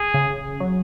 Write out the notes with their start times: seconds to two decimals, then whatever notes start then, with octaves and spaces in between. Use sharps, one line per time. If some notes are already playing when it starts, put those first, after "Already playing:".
Already playing: G#4
0.14 C#3
0.60 F#3